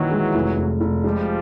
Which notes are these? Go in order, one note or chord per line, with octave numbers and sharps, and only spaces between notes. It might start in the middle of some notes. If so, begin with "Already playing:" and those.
Already playing: A#1 D#3 E3 F#3
G#3
F1
F1
F1
F3 G3 G#3